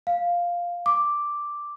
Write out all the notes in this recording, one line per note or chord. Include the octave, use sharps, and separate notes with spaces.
F5
D6